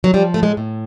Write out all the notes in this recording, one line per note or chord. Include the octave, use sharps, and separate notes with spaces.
F#3
F3 G3
A2 A3
G#3
A2